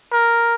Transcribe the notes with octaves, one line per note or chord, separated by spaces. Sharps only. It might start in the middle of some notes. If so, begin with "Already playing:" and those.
A#4